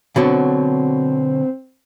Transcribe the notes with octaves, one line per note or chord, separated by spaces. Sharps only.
B2 D3 F#3 C4